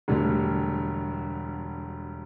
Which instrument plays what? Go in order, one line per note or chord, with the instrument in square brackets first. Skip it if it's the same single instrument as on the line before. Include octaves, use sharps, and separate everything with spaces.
[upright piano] E1 D2 D3 G3